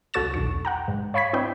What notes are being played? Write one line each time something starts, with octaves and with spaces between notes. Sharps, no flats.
C#2 F#4 A4 C#6 A6 E7
B1 E2 C#6
F#5 G5 A#5
G#2
C#5 F5 B5 C#6 G#6 B6
C4 D4 E4 D5 D#5 G5